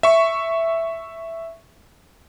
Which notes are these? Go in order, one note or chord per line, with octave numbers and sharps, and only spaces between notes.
E5 C#6